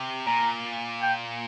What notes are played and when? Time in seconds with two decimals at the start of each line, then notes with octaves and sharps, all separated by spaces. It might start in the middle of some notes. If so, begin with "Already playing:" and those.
Already playing: C3
0.27 A#2 A#5
1.02 G5